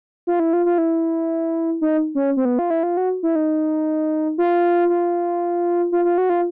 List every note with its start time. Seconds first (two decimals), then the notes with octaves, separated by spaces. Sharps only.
0.27 F4
0.40 E4
0.53 F4
0.66 F4
0.78 E4
1.81 D#4
2.15 C#4
2.37 C4
2.45 B3
2.59 F4
2.70 E4
2.83 F4
2.97 F#4
3.23 E4
3.35 D#4
4.38 F4
4.89 F4
5.92 F4
6.05 F4
6.18 F#4
6.30 F4